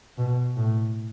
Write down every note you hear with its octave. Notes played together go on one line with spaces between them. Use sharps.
B2
A2